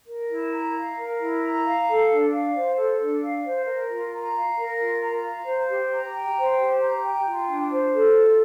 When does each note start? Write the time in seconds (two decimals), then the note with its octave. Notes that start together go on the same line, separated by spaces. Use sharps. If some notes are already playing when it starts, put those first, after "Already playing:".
0.07 A#4
0.29 E4
0.51 A#5
0.75 F5
0.97 A#4
1.19 E4
1.42 A#5
1.65 F5
1.87 A4
2.09 D4
2.32 F5
2.54 C5
2.77 A4
2.99 D4
3.22 F5
3.44 C5
3.66 A#4
3.88 F4
4.11 A#5
4.34 F5
4.56 A#4
4.79 F4
5.01 A#5
5.23 F5
5.45 C5
5.68 G4
5.91 A#5
6.14 G5
6.36 C5
6.58 G4
6.81 A#5
7.02 G5
7.25 F4
7.48 D4
7.70 C5
7.93 A4
8.16 F4